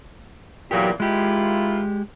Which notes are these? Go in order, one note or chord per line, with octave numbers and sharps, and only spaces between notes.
E2 A#2 F#3 G4
D#3 G#3 E4 F4 G4